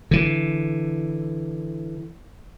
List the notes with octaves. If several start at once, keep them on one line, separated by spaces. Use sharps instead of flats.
D3 E3